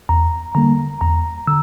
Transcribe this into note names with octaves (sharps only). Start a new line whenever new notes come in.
E2 A#5
D3 G3 A#3 A#5
E2 A#5
D3 E6